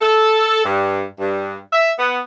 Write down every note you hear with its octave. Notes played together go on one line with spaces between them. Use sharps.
A4
G2
G2
E5
B3